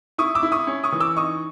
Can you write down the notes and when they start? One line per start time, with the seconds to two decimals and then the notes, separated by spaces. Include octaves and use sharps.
0.18 E4 C#6 D#6
0.35 D6 E6
0.43 E4
0.52 C#6 D#6
0.67 C#4
0.84 C#6 D#6
0.92 E3
1.00 D6 E6
1.16 D#4 C#6 D#6